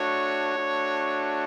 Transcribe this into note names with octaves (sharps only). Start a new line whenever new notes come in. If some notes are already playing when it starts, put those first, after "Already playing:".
Already playing: A3 D4 F#4 C#5
A3 D4 F#4